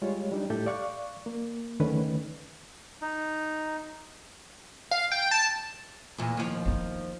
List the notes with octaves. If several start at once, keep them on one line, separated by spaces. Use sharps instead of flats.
G3 G#3 F4 C#5
G3 D4 D#4
A2 G4 A4 E5 G6
D5 F5 C#6 D6 F#6
A#3
D#2 D3 D#3 A3 C#4 B4
D#4
F5
G5
A5
E2 A#2
D#2 F3
B3 D#4